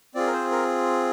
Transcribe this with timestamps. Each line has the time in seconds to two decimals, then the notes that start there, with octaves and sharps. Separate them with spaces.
0.15 C4 F4 G#4 D5
0.27 A#4
0.33 C5
0.51 A#4